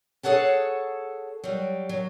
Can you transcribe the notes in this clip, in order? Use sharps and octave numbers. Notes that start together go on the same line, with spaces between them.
G#4 A4 C#5 F#5 A5
F#3 G3
F#3